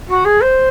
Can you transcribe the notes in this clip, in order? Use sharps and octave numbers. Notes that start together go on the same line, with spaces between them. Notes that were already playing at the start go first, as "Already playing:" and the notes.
F#4
G#4
C5